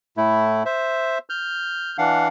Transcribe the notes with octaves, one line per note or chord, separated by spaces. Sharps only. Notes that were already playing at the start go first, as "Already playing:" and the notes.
A2 A3 E4
C5 E5
F6 G6
E3 D4 F5 F#5